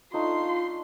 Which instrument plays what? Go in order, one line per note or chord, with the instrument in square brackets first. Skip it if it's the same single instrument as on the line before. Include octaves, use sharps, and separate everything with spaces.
[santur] A3 D4 D#4 [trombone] F4 [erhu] C6